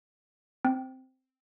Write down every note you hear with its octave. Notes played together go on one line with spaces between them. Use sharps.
C4